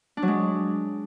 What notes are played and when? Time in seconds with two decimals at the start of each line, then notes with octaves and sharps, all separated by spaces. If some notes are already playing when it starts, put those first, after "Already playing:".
0.17 D4
0.22 F#3
0.28 G#3